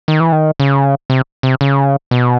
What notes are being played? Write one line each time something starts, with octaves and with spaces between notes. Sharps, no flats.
D#3
E3
D#3
C#3
C3
C3
C#3
B2